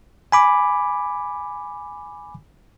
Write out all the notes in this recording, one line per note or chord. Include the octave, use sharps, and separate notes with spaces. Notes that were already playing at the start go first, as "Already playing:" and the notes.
G#5 B5 D6